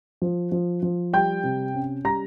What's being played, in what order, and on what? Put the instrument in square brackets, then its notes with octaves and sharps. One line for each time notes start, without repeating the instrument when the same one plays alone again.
[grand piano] F3
F3
F3
G3 G5 G6
C3
C#4
G3 A#5 A#6